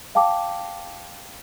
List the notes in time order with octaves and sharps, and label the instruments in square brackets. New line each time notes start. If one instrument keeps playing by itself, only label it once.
[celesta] F5 G5 A5 D6